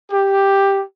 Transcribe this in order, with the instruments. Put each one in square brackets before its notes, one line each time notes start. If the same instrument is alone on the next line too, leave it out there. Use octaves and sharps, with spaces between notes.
[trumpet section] G4